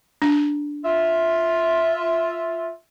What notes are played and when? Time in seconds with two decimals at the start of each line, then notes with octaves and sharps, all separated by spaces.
0.22 D4
0.85 F4 E5